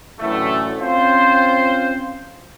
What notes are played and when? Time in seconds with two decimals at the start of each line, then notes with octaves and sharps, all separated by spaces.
0.19 F#2 A2 D3 E3 A3
0.78 C4 C#4 F4 C5